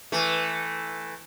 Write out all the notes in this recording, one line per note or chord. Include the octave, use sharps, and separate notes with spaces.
E3 A3